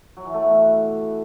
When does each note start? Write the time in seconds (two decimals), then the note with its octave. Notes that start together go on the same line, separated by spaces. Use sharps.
0.17 F#3
0.25 E3
0.34 A3
0.42 B3
0.51 B2